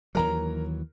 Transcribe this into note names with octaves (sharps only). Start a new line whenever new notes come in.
D#2 E3 F#3 A#4 A#5